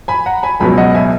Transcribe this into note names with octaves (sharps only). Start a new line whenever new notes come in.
G#5 B5
F#5 A#5
G#5 B5
C#2 B2 F#3 G#5 B5
D#5 F#5
E5 G#5